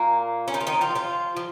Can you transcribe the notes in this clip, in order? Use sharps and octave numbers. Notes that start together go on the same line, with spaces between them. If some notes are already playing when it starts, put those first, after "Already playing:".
Already playing: A#2 A#3
C#4
D#3 D#4
F4
D#3 D#4
F3 F4
F3 F4
F3